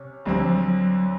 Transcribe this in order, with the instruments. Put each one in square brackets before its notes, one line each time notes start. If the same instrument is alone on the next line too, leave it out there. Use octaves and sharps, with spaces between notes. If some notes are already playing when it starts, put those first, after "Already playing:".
Already playing: [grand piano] C3 C#4
[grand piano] D2 D3 G3 C4 [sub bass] F3
[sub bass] F#3
F3
F#3